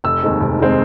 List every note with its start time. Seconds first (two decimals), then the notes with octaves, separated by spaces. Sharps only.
0.04 F1 E6
0.22 D#2 D#3 G#3 C4
0.41 F1
0.60 D#3 G#3 C4